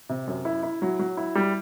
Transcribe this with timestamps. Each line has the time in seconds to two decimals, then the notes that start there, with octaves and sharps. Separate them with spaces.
0.09 C3
0.27 F#2
0.45 E4
0.63 E4
0.82 F#3
0.99 F#3
1.17 E4
1.35 G3